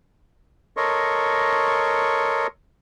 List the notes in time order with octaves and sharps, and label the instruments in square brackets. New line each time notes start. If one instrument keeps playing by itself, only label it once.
[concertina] A4 A#4 C#5 D#5 C6 C#6